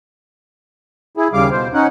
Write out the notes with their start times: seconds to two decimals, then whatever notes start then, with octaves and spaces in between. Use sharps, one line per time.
1.17 E4 G#4
1.33 D#2 C#3 G3 F5 D6
1.51 B2 C5
1.74 C#4 D#4 F#5